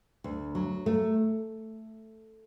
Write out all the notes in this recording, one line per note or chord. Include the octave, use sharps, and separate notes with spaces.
D2
F#3
A3